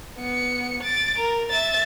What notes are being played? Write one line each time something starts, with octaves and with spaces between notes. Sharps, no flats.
B3 C#7
A6 D7
A#4
E5 A6